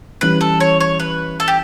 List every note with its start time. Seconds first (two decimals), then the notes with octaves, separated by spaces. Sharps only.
0.21 E3 G3 C#4 B4
0.41 A4
0.60 C#5
0.80 C#5
1.00 B4
1.40 A4
1.48 G4